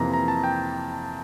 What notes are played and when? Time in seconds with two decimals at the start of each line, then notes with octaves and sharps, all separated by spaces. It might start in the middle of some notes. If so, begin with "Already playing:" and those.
Already playing: F2 C3 E3 A#3 A#5
0.14 A#5
0.28 A5
0.44 G5